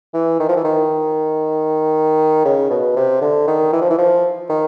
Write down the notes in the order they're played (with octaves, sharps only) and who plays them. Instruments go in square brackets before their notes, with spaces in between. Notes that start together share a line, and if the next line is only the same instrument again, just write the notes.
[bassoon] E3
D#3
F3
E3
D#3
C#3
B2
C3
D3
D#3
E3
F3
E3
F3
D#3